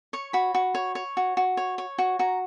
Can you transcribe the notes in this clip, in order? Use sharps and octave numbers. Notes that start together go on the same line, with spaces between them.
C#5 C#6
F#4 B5
F#4
C#5
C#5
F#4
F#4
C#5
C#5
F#4
F#4 A#5